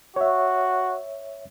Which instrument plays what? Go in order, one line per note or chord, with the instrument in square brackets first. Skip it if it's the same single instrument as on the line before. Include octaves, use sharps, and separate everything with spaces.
[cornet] F#4 [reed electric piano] C#5 E5